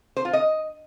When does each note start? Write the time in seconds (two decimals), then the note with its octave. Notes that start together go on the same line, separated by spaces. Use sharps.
0.17 C5
0.25 F4
0.33 D#5